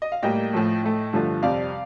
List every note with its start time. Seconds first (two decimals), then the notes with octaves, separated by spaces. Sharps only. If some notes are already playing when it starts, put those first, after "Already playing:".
0.02 D#5
0.12 F5
0.23 A2 G3 A#3 D#5 G5
0.53 A2 F3 A3
0.83 A2 A3
1.13 G2 D3 F3 A3
1.42 F2 C3 G3 D5 F5